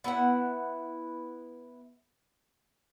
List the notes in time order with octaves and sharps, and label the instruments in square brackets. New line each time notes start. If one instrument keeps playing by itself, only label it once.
[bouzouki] B3 E4 E5 F#5